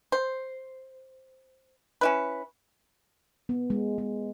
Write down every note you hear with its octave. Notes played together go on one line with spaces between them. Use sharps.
C5
C#4 E4 B4
B3
G#3
G#3